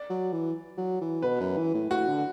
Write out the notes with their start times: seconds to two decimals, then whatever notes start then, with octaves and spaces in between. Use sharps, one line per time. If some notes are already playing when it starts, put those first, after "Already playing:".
Already playing: D5
0.10 F#3
0.32 E3
0.77 F#3
1.01 E3
1.22 B2 B4
1.40 F#2
1.57 E3
1.74 A2
1.90 A2 F#4
2.08 D3